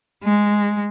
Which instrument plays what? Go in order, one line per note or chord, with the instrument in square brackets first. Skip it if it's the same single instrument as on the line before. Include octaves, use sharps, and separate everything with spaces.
[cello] G#3